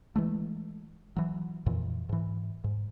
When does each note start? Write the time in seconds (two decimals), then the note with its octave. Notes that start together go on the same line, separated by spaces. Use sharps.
0.16 E3 G#3 A3
1.16 E3 F#3
1.66 F2 A#2 E3
2.09 G#2 E3
2.64 G#2